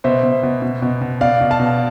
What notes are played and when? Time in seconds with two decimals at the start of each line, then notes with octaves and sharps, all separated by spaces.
0.04 B2 C5 E5
0.23 B2
0.43 B2
0.62 B2
0.82 B2
1.01 B2
1.21 B2 D5 F5
1.41 B2
1.51 F5 A5
1.60 B2